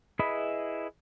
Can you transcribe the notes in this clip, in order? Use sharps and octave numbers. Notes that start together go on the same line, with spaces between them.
E4 G#4 B4 D#5 B5